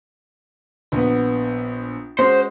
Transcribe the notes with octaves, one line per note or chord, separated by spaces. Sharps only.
A#1 B3
G#3 C#4 F#4 C5